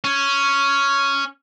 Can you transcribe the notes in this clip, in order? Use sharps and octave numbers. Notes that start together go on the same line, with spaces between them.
C#4